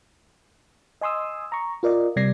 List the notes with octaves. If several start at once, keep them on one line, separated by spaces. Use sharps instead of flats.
D#5 G#5 C6 D#6 E6
A#5 C#6
F4 A#4 D5 D#5
C3 G3 D5 G#6 A#6 C7